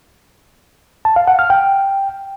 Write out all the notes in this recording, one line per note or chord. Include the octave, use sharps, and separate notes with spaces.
A5
F5
F#5
F6
G5